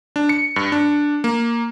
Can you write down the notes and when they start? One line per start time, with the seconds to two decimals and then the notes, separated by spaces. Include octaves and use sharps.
0.16 D4
0.29 C#7
0.56 G2
0.72 D4
1.24 A#3